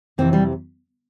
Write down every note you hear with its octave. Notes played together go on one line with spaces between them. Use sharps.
F2 C3 E3 C4
G3